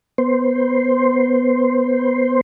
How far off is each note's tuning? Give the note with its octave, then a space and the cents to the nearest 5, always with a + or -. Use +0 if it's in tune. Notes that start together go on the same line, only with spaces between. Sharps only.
B3 +0 C5 +0